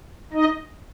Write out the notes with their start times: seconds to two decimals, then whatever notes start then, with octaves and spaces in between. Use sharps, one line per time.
0.33 D#4 D#5